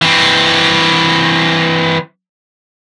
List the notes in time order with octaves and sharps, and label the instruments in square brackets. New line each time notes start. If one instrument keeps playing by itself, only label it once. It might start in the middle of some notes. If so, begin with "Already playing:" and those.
[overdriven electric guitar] E3 C4